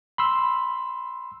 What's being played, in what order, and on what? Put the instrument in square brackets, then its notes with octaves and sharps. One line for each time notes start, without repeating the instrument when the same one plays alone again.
[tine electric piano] B5 C6 E6